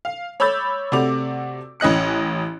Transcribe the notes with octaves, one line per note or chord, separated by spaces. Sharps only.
F5
C#5 B5 D6 E6 G6 A6
C3 A3 F#4 D5 D6 F7
A1 C#4 D#5 F#6 C#7